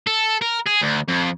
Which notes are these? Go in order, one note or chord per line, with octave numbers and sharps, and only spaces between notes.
A4
A#4
G#4
D2
F2